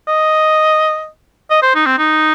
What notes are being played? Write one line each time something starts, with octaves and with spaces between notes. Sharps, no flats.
D#5
D#5
C5
D#4
C4
D#4